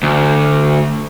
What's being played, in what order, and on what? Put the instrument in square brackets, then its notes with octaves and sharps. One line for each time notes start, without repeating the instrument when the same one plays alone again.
[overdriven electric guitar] D2